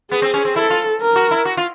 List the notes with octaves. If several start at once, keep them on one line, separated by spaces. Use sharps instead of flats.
B3 G#4
C4
C#4
C4
E4 A4
F4
A#4
F#4
E4
F#4
F4